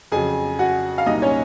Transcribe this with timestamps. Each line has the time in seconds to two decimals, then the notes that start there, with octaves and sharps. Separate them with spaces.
0.12 F2 C#3 F#3 G#4 G#5
0.59 F#4 F#5
0.98 F5
1.06 C2 A#2 F#3 D#4 D#5
1.22 C#4 C#5